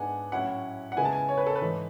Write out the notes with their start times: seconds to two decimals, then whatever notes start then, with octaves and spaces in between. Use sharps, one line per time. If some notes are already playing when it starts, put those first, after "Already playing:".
Already playing: G#2 G#3 B3 D4 F#5 G#5
0.32 A2 F#3 C#4 E4 F#5
0.92 F#5
0.96 C#3 G#3 B3 E4 G#5
1.05 A5
1.13 G#5
1.29 C#5
1.37 B4
1.47 A4
1.56 B4
1.61 G#2 E3 A3